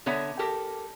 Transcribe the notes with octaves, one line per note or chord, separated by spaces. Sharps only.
D3 B3 C#5 E5 A#5
G4 A4 A#4